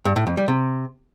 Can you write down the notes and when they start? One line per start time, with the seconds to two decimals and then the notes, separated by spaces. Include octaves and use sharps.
0.05 G2
0.16 A2
0.27 F2
0.37 G3
0.48 C3